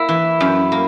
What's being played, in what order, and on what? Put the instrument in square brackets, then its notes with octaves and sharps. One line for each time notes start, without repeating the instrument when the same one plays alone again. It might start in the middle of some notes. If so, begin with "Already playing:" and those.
Already playing: [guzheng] A#3 [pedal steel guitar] E4
[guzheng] E3
F#2
A#3